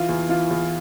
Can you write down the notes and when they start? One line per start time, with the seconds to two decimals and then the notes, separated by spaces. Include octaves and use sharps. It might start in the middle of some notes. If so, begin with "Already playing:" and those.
Already playing: E3 F4
0.09 E2
0.29 E3 F4
0.51 E2